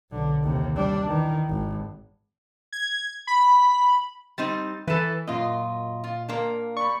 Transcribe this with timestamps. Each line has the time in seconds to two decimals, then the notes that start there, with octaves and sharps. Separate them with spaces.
0.11 B1 D3
0.43 D#2 C3
0.76 G3 D4
1.07 D#3 E3
1.49 G#1
2.73 G#6
3.27 B5
4.38 G3 C4 D#4 A6
4.87 E3 A4 B4
5.27 F#2 A#2 A#3 F4 D#5
6.04 F4
6.29 A#2 A#3 D4 A#4
6.77 D5 B5 C#6